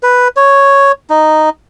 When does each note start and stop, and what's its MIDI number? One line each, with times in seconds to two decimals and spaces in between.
0.03 0.28 71
0.37 0.92 73
1.10 1.49 63